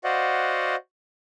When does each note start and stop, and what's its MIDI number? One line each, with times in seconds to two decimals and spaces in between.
0.04 0.75 66
0.04 0.75 72
0.04 0.75 74
0.04 0.75 75
0.04 0.75 77
0.04 0.75 78